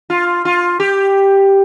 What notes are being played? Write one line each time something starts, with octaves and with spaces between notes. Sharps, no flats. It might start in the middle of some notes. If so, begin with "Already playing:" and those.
F4
F4
G4